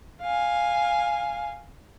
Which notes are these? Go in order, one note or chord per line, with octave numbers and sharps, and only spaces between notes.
F5 G#5